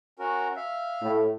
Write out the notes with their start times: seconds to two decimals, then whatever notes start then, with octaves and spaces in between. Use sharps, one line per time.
0.19 C#4 F#4 A#4
0.56 E5 F5
1.03 A2